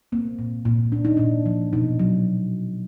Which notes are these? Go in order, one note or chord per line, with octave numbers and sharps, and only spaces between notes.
A#3 C4
A#2
A#2
A#2 D4
D#4
A#2 D4
F3
B2 D#4
F#3